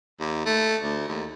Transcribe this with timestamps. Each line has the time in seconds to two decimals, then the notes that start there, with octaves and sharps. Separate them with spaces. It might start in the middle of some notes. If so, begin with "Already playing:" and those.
0.20 D#2
0.45 A3
0.82 D2
1.08 D#2